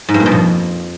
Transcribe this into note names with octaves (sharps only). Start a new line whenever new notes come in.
G#2
G2
A#2
B2
F2